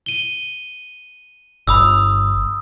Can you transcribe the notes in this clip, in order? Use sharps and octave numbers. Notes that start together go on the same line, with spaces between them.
D#7 G7
G1 B5 D#6 E6